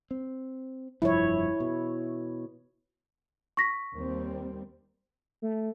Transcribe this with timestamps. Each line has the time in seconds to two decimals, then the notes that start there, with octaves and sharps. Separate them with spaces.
0.11 C4
1.02 F1 G2 F3 E4 C#5
1.60 B2
3.57 C#6 A#6 B6
3.95 D#2 G3 C4
5.42 A3